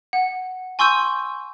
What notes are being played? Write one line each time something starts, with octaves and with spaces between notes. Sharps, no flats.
F#5
G#5 C6 C#6 E6 G6 D#7